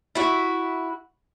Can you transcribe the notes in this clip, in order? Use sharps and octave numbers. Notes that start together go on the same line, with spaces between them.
E4 F#4